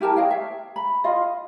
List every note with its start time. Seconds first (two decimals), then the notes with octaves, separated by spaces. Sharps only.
0.01 E4 G4 A#4 A5
0.16 C#5 D#5 F5 G5
0.31 E5
0.76 B5
1.04 F4 D#5 F5